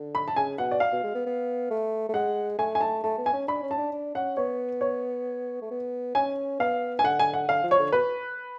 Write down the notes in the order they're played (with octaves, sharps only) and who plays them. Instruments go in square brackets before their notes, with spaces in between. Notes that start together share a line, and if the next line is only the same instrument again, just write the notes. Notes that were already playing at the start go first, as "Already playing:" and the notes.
Already playing: [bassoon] D3
[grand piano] B5
A5
[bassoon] C#3 [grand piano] G#5
[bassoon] B2 [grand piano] F#5
[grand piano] D5
F5
[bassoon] B2
G#3
B3
B3
A3
A3
[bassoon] G#3 [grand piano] F#5
[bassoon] A3 [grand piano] G#5
[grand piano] G#5
A5
[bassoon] A3 [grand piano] A5
[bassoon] B3
[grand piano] G#5
[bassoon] C#4
[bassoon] D4 [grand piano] B5
[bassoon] C#4
[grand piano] A5
[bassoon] D4
D4
[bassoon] C#4 [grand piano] F#5
[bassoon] B3 [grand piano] C#5
[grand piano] C#5
[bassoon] A3
B3
[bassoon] C#4 [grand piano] G#5
[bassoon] B3 [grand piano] F5
[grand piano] G#5
[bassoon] D3 [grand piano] F#5
[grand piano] G#5
F#5
[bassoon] D3 [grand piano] F5
[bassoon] F3
[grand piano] C#5
[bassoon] D3
[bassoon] B2 [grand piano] B4